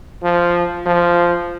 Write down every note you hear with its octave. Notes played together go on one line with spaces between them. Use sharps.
F3
F3